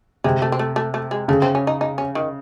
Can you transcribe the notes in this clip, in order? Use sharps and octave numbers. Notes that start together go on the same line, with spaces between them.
C3 G#3
A3
C4
A3
A3
A3
G#3
C#3 A3
C4
C#4
D#4
D#4
C#4
D#3